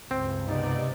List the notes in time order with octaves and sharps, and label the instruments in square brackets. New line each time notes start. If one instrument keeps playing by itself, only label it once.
[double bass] C#2 G2 [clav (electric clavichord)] C4
[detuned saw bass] C3 [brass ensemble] B3 D#4 D5